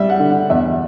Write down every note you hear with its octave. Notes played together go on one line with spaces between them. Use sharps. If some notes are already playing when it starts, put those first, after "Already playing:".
Already playing: G3 E5
F#5
D3
F#5
E2 E5